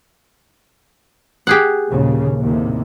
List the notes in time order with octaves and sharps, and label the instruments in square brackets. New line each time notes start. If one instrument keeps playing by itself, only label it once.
[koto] G4 G#4 F#5
[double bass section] A#1 D#2 C#3
D#2 A2 C3